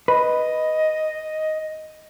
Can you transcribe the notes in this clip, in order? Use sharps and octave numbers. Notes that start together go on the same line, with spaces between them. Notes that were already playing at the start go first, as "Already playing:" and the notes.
B4 D#5